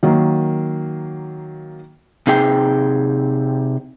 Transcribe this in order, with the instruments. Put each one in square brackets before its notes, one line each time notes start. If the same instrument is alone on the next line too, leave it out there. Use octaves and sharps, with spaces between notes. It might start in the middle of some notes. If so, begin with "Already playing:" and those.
[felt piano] D#3 F#3 A#3
[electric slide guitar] C3 D#4 G#4 G5